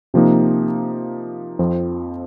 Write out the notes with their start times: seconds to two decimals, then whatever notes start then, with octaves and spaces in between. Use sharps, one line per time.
0.14 C3 F3 A#3 D#4
1.59 F2 F3 C4